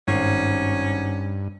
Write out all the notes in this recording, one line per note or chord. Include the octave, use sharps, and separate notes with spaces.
G#1 G2 C#4